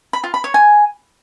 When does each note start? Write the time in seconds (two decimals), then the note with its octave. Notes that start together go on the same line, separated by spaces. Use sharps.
0.13 B5
0.24 F4
0.34 B5
0.44 C#5
0.54 G#5